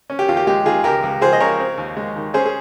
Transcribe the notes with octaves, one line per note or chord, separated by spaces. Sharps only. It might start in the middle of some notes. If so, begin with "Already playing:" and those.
C#4
G4
D#2 F4
G4
G#3 G4
D#3 F4 G#4
C#2 G4 A#4
C#2
F3 G#4 C5
D#5
C#3 A#4 C#5
C4
D#2
G#3
D#3
C#4 G#4 C5
G#4